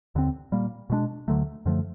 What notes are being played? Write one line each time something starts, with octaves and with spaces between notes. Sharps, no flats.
D#2 D3 G3 C4
A#2 G3 A#3
B2 G#3 B3 D4
D2 D3 F#3 A3
F#2 D3 F3 A3